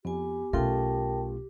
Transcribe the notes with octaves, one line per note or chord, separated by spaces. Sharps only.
F2 B3 G4 G#5
B1 A3 C#4 F4 A#4 G5 A5